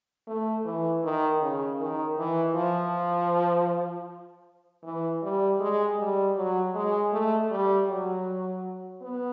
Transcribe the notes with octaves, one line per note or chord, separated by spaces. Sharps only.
A3
E3
D#3
C#3
D#3
E3
F3
E3
G3
G#3
G3
F#3
G#3
A3
G3
F#3
B3